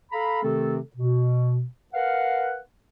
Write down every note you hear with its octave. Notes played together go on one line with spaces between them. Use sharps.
A4 F5 A#5 B5
C3 D#3 A3 C4 A4
B2
A#4 B4 F5 F#5